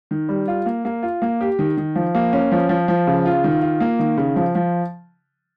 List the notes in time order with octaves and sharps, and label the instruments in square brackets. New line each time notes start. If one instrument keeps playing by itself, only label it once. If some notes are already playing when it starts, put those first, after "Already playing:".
[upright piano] D#3
G3
F4
A#3
A#3
F4
A#3
G4
D#3
D#3
F3
A#3
C#4
F3
F3
F3
C#3
F4
D#3
F4
A#3
D#3
C#3
F3
F3